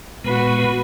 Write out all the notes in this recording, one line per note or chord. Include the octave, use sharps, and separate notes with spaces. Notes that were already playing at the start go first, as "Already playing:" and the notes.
A#2 G#3 B3 F#4 B4